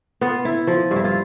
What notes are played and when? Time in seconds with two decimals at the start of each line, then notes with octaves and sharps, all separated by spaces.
0.21 B3 F4
0.45 E4
0.67 F3
0.91 G2
0.96 E4
1.04 F4